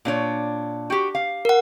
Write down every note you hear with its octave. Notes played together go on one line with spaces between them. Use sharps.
A#2 D4 C#5
F#4 G4
F5
A#4 F#5